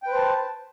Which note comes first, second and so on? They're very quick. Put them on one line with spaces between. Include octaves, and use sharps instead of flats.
G5 B4 C5 A5